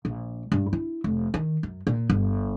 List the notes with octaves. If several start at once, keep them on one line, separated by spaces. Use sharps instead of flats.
A#1
G2
E4
F1
D#3
F#2
A#2
G1